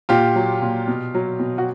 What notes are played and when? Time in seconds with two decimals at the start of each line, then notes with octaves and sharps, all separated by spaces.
0.09 A#2 F4 G4
0.36 F#3
0.62 A#2
0.88 B2
1.15 F#3
1.40 B2
1.58 F#4